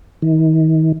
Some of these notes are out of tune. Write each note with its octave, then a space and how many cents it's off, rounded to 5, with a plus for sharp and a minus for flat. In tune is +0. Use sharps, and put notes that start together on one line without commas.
D#3 +40